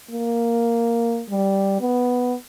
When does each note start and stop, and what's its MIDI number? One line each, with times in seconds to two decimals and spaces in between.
0.11 1.22 58
1.30 1.77 55
1.81 2.34 59